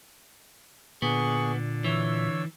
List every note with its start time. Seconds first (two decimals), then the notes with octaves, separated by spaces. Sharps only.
1.02 A#2 D3 B3 G#4 C#6
1.84 E3 C#5 E6